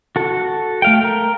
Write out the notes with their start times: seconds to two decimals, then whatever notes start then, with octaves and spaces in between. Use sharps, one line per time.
0.16 F#4 A4
0.82 A3 F5 G5
1.04 A#4